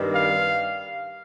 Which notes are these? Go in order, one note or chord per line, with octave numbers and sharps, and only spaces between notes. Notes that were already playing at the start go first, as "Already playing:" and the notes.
Already playing: G2 D#3 G3 C4
F5